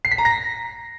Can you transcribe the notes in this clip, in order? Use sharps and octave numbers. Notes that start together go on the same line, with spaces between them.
C7
B6
A#5
A#6